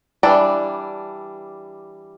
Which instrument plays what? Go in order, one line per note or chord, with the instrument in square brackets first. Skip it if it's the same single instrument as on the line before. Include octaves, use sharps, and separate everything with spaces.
[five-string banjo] E3 G3 D4 D5